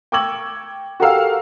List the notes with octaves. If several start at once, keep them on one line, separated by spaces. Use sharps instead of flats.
G5 C#6 D6 E6 G#6 F#7
F#4 G4 A4 A#4 F5 E6